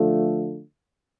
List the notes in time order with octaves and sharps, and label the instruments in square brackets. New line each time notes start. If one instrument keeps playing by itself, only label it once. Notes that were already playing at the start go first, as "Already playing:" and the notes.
Already playing: [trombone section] D3 F3 A3